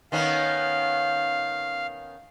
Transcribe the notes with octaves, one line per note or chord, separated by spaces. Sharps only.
D#3 B3 C#4 F5